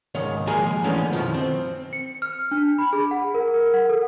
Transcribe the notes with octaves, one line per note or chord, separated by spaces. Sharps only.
C#2 G#2 D#3 C#5
F3 G#3 A#3 G#4 G#5 A#5
D3 E3 A3 B3 C#4
F#2 B2 D#3 F3
C4
C#7
F6
D4
B5
G#4
F#5
A#4
A#4
F#5
A4